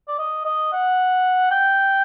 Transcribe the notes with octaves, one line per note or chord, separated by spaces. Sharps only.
D5
D#5
D#5
F#5
G5